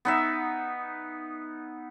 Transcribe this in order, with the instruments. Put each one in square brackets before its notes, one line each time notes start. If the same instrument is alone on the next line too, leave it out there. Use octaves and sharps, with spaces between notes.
[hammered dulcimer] B3 D#4 E5